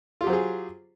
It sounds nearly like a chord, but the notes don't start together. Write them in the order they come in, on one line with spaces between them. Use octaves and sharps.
F4 G4 F#3 C5 G#4